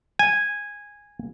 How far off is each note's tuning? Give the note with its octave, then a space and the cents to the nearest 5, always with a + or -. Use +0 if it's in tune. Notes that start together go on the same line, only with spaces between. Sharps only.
G#5 -10